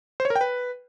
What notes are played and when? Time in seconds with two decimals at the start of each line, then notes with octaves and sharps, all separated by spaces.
0.20 C5
0.25 C#5
0.30 A#4
0.36 G5
0.41 B4